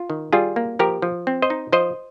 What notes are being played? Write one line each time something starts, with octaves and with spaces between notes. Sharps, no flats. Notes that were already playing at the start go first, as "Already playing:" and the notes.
Already playing: F4
D#3
G3 F4 G#4
A#3
F3 G4 A#4
F3
C4
C5 D#5
D#4
F3 C5 D#5